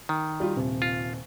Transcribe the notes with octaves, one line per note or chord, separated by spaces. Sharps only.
D#3
G3 F4
D#1 C3
F4